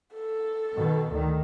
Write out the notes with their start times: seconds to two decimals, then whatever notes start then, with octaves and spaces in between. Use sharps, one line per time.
0.14 A4
0.74 B2 D#3
1.10 D2 D#3